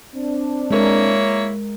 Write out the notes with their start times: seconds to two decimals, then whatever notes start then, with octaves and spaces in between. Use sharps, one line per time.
0.16 C4 D4
0.71 G#3 A#3 E4 A#4 C#5